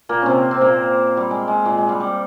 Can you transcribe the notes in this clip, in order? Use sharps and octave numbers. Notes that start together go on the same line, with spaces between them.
A#2 A#3
C3 C4 C#4
C4
A#2 A#3
G3
G#3
G#3
A#2 A#3
G#3
G3
G3